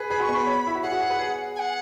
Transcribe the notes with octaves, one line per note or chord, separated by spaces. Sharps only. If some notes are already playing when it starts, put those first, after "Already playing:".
Already playing: G#4 B4
G#4 B5
F#4
C#6
B3
B4 B5
C#5
E4
F#4
G#4 F#5
F#4
G#4
B4
G#4
G#5
F#5